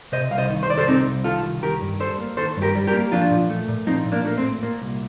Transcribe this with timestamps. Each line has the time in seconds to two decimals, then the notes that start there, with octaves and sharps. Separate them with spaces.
0.12 C3 C5 D#5
0.31 C2 F5
0.38 C5 D#5
0.50 D#3
0.63 C5
0.70 C2 D5
0.78 A4 C5
0.88 C3 C4 D#4
1.06 C2
1.24 D#3 F4 A4
1.43 C2
1.62 D#3 G4 A#4
1.81 G2
2.00 G3 A4 C5
2.18 A#3
2.37 D#3 A4 C5
2.57 G2
2.62 G4 A#4
2.75 G3
2.87 G4 A#4
2.94 A#3
3.12 F3 D4 F4
3.31 A#2
3.50 A3
3.68 A#2
3.87 F3 C4 D#4
4.05 A#2
4.12 A#3 D4
4.25 A3 A#3
4.38 C4
4.43 A#2
4.63 A#2 A#3
4.81 C2